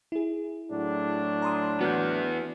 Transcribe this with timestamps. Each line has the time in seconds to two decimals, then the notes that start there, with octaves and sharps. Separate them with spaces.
0.12 E4 G#4
0.70 A2 F#3 D4
1.42 A#5 C6 D#6
1.81 E2 B3 F#4 F6 G6